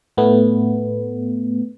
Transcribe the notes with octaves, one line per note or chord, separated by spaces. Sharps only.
A2 A3 B3